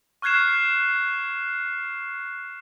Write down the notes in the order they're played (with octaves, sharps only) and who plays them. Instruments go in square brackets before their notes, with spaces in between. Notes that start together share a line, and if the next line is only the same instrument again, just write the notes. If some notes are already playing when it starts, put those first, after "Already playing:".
[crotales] C#6 F6 F#6 G#6 C7 E7